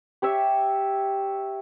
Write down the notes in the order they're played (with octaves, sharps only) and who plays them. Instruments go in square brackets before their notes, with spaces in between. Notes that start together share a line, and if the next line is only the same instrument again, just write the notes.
[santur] G4 C#5 E5